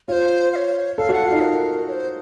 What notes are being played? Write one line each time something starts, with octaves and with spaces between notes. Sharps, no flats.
F4 C5 C#5
F5
C#5
A4 F5
F#4 F#5
F4
D#4 F5
A#4
C#5
C5